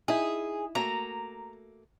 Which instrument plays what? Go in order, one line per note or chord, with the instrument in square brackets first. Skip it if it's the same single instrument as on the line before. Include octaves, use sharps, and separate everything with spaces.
[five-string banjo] D#4 E4 [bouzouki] G#4
[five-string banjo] A3 A#3 F#4 [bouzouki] A#5